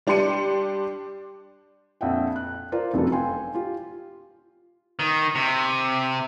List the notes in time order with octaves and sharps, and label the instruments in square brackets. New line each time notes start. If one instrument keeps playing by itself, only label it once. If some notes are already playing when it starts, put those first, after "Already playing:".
[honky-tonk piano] G3 D4 G4 C6 C#7 D#7
[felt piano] A#1 F2 E5 F#5 G5
F#6
F4 A#4 C5 D5
F1 F#2 C3 F#3 A3 A4
F5 G5 G#5 C6
F4 G4
[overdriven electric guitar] D#3
C3